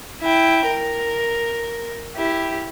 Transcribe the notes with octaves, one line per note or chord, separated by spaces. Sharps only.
E4 G5
A#4
E4 G4